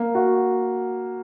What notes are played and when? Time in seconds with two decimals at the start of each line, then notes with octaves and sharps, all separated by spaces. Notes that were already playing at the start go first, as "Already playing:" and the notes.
Already playing: A#3
0.15 F#4